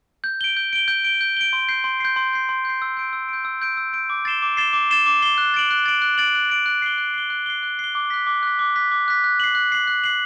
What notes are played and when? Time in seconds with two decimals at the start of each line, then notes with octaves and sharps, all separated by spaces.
0.24 G6
0.41 D7 G7
0.57 G6
0.73 D7 G7
0.88 G6
1.04 D7 G7
1.21 G6
1.37 D7 G7
1.53 C6
1.69 G6 C7
1.84 C6
2.00 G6 C7
2.16 C6
2.33 G6 C7
2.49 C6
2.65 G6 C7
2.82 E6
2.97 G6 D7
3.13 E6
3.29 G6 D7
3.45 E6
3.62 G6 D7
3.77 E6
3.93 G6 D7
4.10 D6
4.25 A6 C7 E7 G7
4.42 D6
4.57 A6 C7 E7 G7
4.73 D6
4.90 A6 C7 E7 G7
5.06 D6
5.22 A6 C7 E7 G7
5.38 F#6
5.54 A6 D7 F#7
5.71 F#6
5.86 A6 D7 F#7
6.02 F#6
6.18 A6 D7 F#7
6.35 F#6
6.50 A6 D7 F#7
6.66 F#6
6.82 C7 G7
6.98 F#6
7.14 C7 G7
7.30 F#6
7.46 C7 G7
7.63 F#6
7.79 C7 G7
7.95 D6
8.10 F#6 B6
8.27 D6
8.43 F#6 B6
8.59 D6
8.76 F#6 B6
8.92 D6
9.08 F#6 B6
9.24 F#6
9.40 C7 F#7
9.55 F#6
9.72 C7 F#7
9.87 F#6
10.04 C7 F#7